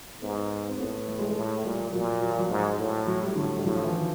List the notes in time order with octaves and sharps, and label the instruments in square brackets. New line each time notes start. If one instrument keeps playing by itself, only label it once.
[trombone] G#2 [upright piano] B3
[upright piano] C4
[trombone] A2 [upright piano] B3
[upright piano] B3
A3
G#3
A3
[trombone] A2
[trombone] A#2 [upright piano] G3
[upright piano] F3
[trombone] A#2 [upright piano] F#3
[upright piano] F#3
F3
F#3
[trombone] G#2
A2
[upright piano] F#3
G3
[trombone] A2 [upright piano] D3
[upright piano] G3
[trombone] A2 [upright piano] F#3
[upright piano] F3
E3
D#3